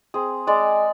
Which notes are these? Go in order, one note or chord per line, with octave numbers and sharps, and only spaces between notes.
C4 G#4
G#3 D5